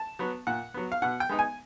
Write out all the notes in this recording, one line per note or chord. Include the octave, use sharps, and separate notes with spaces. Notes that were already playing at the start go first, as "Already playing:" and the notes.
Already playing: A5
F#3 B3
A#2 F#5
F#3 B3
F5
B2 F#5
G5
G#3 B3 D#4
G#5